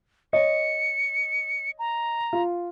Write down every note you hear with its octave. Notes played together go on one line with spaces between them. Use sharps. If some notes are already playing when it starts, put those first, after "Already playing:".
C#5 D#5 C#7
A#5
F4